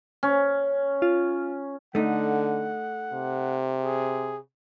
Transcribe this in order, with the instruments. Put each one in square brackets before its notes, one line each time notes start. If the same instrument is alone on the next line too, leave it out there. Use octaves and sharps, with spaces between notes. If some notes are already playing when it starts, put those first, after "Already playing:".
[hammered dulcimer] C#4
[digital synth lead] F4
[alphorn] D3 [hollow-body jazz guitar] A3 D#4 [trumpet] F#5
[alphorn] C3
[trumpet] G#4